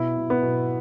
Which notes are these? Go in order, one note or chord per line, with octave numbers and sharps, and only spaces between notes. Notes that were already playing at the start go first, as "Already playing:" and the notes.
Already playing: B2 E4
B2
B3
B2